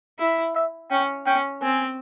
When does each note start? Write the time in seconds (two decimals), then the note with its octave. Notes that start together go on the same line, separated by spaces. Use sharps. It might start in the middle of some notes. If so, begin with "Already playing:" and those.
0.19 E4
0.55 E5
0.90 C#4 G5
1.26 C#4 G5
1.62 C4 G#5